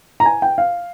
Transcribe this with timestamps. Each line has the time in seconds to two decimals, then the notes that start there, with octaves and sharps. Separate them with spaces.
0.20 A#5
0.26 G#5
0.42 G5
0.58 F5